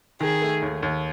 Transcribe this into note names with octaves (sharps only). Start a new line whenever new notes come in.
D#3 G#4
A3
D#2
D#2